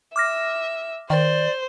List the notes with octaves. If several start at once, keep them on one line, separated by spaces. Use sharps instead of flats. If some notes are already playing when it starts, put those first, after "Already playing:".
E5 D6 F6 A#6
D#3 C5 D5